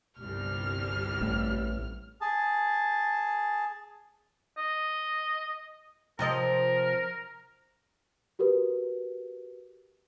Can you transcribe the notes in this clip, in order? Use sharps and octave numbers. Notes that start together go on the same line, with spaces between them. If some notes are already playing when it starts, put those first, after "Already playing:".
G1 C2 G3 F6
A1 A2
G#4 A5
D#5
C3 F3 A#4 D#5
F#4 G4 A#4 B4